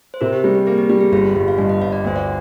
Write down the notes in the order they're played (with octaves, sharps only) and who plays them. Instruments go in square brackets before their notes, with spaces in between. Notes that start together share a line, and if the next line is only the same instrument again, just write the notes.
[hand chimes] C5
[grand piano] C3 [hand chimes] A#4
[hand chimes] G4
[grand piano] G3 [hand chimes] G#4
[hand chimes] G4
[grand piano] A#3 [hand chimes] G#4
[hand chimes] G4
[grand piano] G3 [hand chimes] G4
[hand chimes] G#4
[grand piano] G1 [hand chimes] G#4
[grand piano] G1 [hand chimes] G4
[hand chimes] F5
[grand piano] G2 [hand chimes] D#5
[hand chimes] D#5
[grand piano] G1 [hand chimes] F5
[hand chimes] D5
[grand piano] D2 [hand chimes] C5
[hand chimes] D5